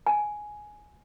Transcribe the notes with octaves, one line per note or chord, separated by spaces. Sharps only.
G#5